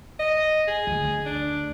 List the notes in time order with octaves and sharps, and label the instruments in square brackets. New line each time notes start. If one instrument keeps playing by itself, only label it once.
[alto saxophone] D#5
G#4
[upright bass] D2
[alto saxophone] D4